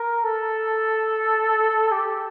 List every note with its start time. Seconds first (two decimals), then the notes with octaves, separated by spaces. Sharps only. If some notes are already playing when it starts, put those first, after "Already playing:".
Already playing: A#4
0.23 A4
1.91 G4